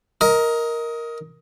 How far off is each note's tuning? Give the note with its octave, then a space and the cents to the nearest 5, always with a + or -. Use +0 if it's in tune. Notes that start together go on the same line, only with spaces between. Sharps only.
A#4 +0 D#5 +20